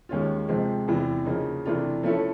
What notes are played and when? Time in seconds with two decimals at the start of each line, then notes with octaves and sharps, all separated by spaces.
0.09 D#2 D#3 G#3 C#4 F4
0.49 C3 F3 G#3 C4
0.88 E2 C3 E3
1.26 C#3 F3 A#3 D#4
1.65 C3 E3 A3 D4 F4
2.03 F3 A3 C#4 E4 A4